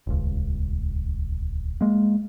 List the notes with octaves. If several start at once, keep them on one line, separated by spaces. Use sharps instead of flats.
D#1 C#2
G#3 A#3